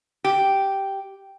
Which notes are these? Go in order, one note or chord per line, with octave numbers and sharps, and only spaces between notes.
G4